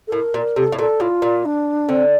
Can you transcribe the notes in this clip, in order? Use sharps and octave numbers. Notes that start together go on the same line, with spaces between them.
A4
A2 A#4
A#2
C3 A4
A2
A#2 A4
A2 F4
A#2
D4
D3 C4